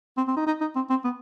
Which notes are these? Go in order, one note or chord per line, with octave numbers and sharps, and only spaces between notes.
C4
C4
D#4
D#4
D#4
C4
C4
B3